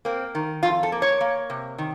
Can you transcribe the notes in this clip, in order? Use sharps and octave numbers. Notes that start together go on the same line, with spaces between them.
A#3 C4
D#3
F2 F4
A4
A#3
C#5
A#3
C3
D#3